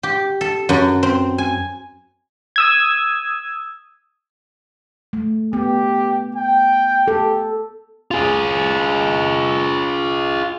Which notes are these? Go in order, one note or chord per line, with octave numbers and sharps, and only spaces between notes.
G4
A4
F#2
C4
G#5
D#6 E6 G#6
A3
B3 G4
G5
G4 A4
F4 G#4